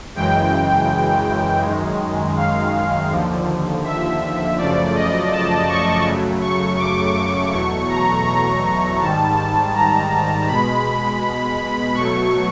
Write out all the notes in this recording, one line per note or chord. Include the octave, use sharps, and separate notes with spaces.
F#2 C#3 E3 G#3 G5
F#2 D#3 G#3
F5
D#2 D3 F3
E5
F#2 C#3 F3 A3 D5
D#5
A5
C#6
F#2 C#3 F#3 A3
C#6
D6
D6
E2 B2 F#3 A3 C#6
A#5
A#5
G#2 D#3 G3 A5
A5
A#5
B2 G#3 B5
B2 F#3 A3 C#6